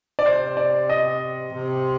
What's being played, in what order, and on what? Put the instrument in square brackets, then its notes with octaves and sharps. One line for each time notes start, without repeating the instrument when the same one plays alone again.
[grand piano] D5
[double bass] C3 [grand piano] C5
[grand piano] D5
D#5
[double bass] C3